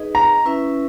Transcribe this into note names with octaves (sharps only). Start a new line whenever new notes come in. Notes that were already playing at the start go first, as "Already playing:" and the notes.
Already playing: D#4 G#4 B4 D#5
A#5
C#4 E4 B4 E5